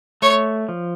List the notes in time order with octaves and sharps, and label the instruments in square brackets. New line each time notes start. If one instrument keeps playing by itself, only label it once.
[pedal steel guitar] A3 [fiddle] C#5
[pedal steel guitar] F3